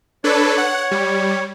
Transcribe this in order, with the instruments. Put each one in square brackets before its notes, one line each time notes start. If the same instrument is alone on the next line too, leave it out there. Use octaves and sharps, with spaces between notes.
[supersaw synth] D4 A4 B4 [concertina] C#5
[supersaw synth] F#5
G3